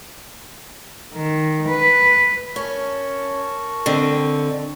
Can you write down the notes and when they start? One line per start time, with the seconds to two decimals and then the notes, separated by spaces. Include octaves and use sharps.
1.15 D#3
1.69 B4
2.56 C#4 A#4 A5 C#6
3.86 D3 C4 D#5